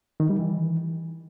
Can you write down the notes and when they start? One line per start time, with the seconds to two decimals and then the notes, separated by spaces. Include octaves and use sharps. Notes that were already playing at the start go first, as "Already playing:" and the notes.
0.20 D#3
0.29 G3
0.39 E3